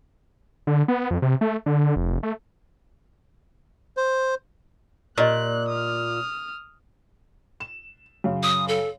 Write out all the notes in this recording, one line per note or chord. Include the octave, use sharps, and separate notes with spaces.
D3
B3
F2
C3
A3
D3
F1
A3
C5
A#2 G4 D#5 F#6
D#6 F6
E7
F#2 C#3
D#6
A4